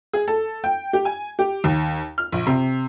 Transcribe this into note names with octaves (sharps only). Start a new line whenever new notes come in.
G#4
A4
G5
G4
G#5
G4
D#2
F6
A#1
C3